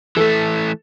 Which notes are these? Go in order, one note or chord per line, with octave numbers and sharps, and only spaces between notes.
E3 A3 A4